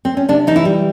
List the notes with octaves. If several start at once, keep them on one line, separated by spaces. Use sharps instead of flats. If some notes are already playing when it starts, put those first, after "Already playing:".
C4
C#4
C3 D4
E3 D#4
E4
G3